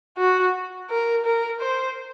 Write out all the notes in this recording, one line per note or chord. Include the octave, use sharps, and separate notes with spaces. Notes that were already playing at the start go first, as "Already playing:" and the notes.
F#4
A#4
A#4
C5